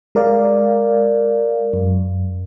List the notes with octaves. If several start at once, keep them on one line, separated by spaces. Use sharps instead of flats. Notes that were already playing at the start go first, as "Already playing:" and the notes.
G#3 A#4 D5 F5
F#2